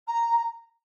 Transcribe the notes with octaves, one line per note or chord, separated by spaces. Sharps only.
A#5
A#5